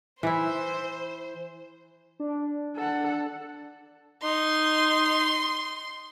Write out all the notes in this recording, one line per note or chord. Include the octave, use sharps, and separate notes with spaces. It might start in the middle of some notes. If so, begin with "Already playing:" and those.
E3 E4 C5
D4
A4 F#5
D#4 C6